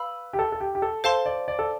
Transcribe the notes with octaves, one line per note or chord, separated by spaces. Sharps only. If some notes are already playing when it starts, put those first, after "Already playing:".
Already playing: B4 F5 B5 E6
G4
A4
A4
G4
G4
A4
A4 C5 F5 A5 C6
D5
D5
A4